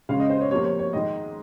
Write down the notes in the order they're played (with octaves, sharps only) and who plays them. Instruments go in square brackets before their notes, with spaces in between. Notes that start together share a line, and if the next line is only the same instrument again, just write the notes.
[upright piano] C#3 G#3 C#4 F5
D#5
C5
C#5
C3 F3 A#3 C#5
C#5
C#5
G#2 D#3 G#3 D#5